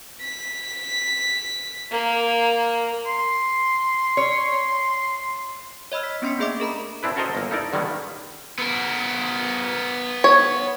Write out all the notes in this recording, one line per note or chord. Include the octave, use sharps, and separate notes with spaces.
B6
A#3
C6
C#5
C#5 D#5 B5 E6 F6
B6
B3 C#4 D4 C6 B6 C#7
A3 A#3 G#4 D#5 E5 D6
G#4 A#4 A#5 B5
C4 D4 E4 B4
C#4 F#4 A4 A#4 C5 D#5
G1 A#3
D#4 E4 A4 A#4 D5
D3 D#3 G3 G#3 A#3 B3
B3 A#4
C#5